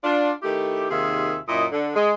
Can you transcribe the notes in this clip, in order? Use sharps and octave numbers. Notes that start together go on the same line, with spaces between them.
D4 F4
D#3 A3 E4 G4
D#2 C3 D#3 F4 G#4 E5
F#2 A#2 E4 D#5
D3
G#3